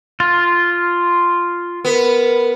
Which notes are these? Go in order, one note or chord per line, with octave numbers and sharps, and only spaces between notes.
F4
B3 A#4